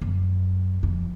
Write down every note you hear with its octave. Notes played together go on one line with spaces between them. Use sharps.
F#2
F2